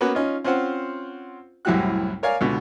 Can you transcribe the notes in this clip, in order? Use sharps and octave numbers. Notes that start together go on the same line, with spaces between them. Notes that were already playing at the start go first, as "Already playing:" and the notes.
A#3 B3 C#4 F#4 B4
C#4 D#4 F4
C4 C#4 F4 C5 F#5
C2 F#2 A2 F#4 G4 F#6
A#4 C#5 D5 F5 G#5
C#2 B2 D3